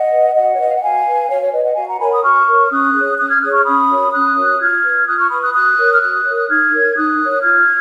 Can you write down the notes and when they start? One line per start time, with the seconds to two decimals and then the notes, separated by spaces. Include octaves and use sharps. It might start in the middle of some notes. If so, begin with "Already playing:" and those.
Already playing: D#5 F#5
0.11 B4
0.35 F#4 D#5 F#5
0.53 C#5
0.58 B4 D#5
0.68 F5
0.75 F#5
0.81 F#4 F5 G#5
1.06 B4
1.29 F#4 C#5 F5
1.41 C#5
1.52 B4 D#5
1.64 D#5 F#5
1.76 F#4 F5 G#5
1.88 F#5 A#5
2.00 A#4 C#5 G#5 B5
2.11 B5 D#6
2.23 F#4 C#6 F6
2.47 A#4 C#5
2.70 C#4 D#6 F#6
2.94 G#4 C#5
3.18 C#4 D#6 F#6
3.29 F6 G#6
3.42 G#4 C#5 D#6 F#6
3.53 C#6 F6
3.65 C#4 B5 D#6
3.89 F#4 A#4 C#5
4.12 C#4 D#6 F#6
4.36 F#4 A#4 C#5
4.59 F4 F6 G#6
4.83 B4
5.06 F4 D#6 F#6
5.18 C#6 F6
5.30 B4 B5 D#6
5.42 D#6 F#6
5.54 F#4 D#6 F#6
5.78 A#4 C#5
5.93 F6
6.01 F#4 D#6 F#6
6.25 A#4 C#5
6.37 F#6
6.48 D#4 F6 G#6
6.73 A#4 C#5
6.95 D#4 D#6 F#6
7.20 A#4 C#5
7.43 F4 F6 G#6